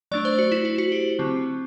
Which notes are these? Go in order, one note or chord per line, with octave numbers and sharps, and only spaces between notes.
F#3 A3 D4 D5
C5
F#4
E4
F#4
F#4
G4
D3 F#3 C4